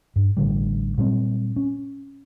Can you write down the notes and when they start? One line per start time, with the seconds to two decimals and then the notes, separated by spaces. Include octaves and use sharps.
0.16 G2
0.37 A1 D3 G3
0.98 A#2 F#3 G3 C4
1.56 C#4